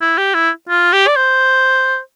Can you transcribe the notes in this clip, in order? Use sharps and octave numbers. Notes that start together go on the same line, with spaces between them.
E4
G4
E4
F4
G4
D5
C5